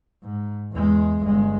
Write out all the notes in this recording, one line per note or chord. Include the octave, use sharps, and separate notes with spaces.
G#2
E2 G#3
G1 G#3